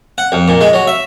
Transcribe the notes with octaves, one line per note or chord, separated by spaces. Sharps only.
F#5
F2
A#2
G#3
F#3
E5